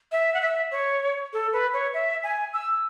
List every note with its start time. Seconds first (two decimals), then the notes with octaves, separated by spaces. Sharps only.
0.12 E5
0.34 F#5
0.41 E5
0.71 C#5
1.33 A4
1.53 B4
1.74 C#5
1.94 E5
2.24 G#5
2.53 E6